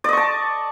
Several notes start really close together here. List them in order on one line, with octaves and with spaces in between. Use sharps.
D5 D#5 C#6 A5